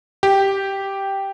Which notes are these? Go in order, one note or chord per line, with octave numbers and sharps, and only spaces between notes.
G4